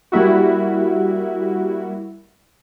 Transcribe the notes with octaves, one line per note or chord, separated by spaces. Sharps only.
G3 A#3 E4 F#4